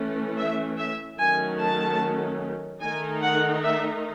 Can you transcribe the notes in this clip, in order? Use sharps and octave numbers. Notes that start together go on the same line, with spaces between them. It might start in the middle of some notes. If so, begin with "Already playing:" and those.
Already playing: E3 A3 C#4
E5
E5
D#3 F#3 A3 C#4 G#5
A5
D#3 A3 D#4 G#5
F#5
E5